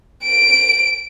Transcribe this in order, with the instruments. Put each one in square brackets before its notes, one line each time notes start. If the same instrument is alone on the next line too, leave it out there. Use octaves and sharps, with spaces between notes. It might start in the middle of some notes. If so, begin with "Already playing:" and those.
[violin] D7